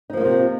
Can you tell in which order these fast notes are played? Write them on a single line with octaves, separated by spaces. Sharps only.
D#4 F3 A#3 F4 C3